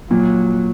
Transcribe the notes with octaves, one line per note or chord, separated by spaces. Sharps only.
A#2 F#3